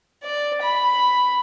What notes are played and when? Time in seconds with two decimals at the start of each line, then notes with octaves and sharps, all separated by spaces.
0.23 D5
0.62 B5